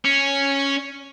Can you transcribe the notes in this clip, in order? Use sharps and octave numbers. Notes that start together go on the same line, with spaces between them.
C#4